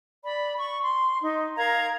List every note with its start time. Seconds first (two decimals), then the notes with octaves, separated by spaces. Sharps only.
0.24 D5 B5
0.58 C#6
0.83 C6
1.23 D#4
1.57 A#4 F5 A#5 G#6